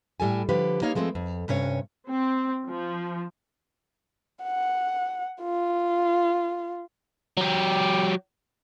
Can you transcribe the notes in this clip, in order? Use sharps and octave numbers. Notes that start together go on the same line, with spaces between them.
A2 G3 A4 G#5
D3 F3 G4 B4
A#3 D#4 C#5 F5
F3 G#3 A3 C4
F2
G2 C3 C#4 C#5
C4
F3
F#5
F4
F#3 G4